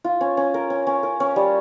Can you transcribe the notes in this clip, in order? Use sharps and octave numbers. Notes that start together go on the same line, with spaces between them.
F4
C#4
C#4
A#4
C#4
C#4
A#4
C#4
G3